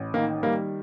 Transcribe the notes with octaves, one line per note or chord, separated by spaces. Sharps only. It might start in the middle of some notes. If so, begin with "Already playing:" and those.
Already playing: A1
D#3 A#3
G3 A#3